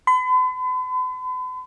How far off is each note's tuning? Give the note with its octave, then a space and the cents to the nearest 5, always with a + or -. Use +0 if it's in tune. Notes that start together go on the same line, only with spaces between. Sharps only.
B5 +45